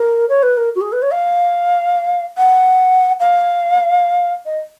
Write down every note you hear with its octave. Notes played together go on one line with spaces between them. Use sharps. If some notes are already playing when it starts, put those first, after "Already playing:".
Already playing: A#4
C#5
B4
A#4
F#4
G#4
B4
C#5
F5
F#5
F5
D#5